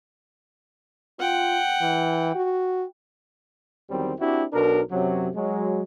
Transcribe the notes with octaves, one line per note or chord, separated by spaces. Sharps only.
F4 F#5 G5
E3
F#4
E2 D#3 F#3 G3 C4
C4 D4 E4 F#4 G4
B1 B2 D4 A#4
F#2 C3 F#3
F#3 G#3